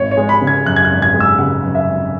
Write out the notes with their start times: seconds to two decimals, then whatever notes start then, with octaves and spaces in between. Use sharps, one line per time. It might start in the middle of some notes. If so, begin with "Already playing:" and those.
Already playing: G#1 C#5
0.11 C#5
0.17 G#3
0.29 B5
0.41 C#3
0.47 G#6
0.66 F#2 F#6
0.76 G#6
0.85 F#6
0.91 G#1
1.02 G#6
1.14 G#3
1.20 E6
1.38 C#3 F#5
1.63 F#2
1.75 E5
1.88 G#1